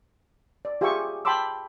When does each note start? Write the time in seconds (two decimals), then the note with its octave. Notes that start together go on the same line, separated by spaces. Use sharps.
0.65 D5
0.81 F4 G4 G#4 E5 G5 C#6
1.25 G5 A5 B5 C6 D6 E6